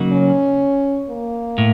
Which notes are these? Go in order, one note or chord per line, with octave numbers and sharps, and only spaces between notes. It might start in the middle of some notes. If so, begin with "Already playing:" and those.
Already playing: C#3 F#3 A#3 D#4 F#4
C#4
A#3
A2